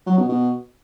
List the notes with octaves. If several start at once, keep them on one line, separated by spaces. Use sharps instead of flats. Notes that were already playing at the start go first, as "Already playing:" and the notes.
F#3
B2
B2